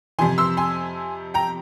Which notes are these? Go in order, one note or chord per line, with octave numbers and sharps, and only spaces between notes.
F2 C3 F3 G#5 C6
C6 E6
G#5 C6
G5 A#5